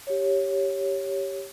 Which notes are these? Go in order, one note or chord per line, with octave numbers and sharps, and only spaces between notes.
G4 C#5